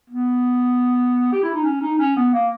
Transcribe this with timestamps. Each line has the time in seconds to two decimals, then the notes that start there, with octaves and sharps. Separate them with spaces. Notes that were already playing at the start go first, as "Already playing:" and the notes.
0.10 B3
1.32 G4
1.43 E4
1.54 D#4
1.64 C#4
1.81 D#4
1.99 C#4
2.16 B3
2.33 A#3